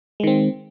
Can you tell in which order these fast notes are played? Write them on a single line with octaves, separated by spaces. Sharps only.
G#3 D#3 C4